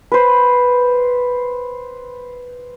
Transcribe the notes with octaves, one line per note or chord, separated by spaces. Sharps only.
B4 C5